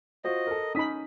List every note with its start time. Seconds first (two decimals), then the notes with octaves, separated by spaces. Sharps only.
0.24 F4 F#4 C5 D#5
0.47 A4 A#4
0.75 C#4 D#4 B5 D#6 B6